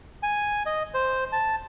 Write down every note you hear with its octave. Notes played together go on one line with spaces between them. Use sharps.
G#5
D#5
C5
A5